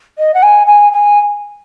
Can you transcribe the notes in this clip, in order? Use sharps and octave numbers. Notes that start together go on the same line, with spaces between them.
D#5
F#5
G#5
G#5
G#5